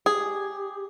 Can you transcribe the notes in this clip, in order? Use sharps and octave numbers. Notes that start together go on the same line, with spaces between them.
G4 G#4